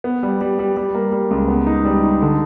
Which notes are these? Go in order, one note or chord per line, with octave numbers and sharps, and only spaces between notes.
B3
G3
G3
G3
G3
A#3
G3
C#2
B3
D#4
G3
D#4
D3